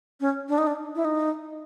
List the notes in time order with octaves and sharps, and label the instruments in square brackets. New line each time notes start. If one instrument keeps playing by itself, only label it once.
[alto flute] C#4
D4
D#4
D4
E4
D#4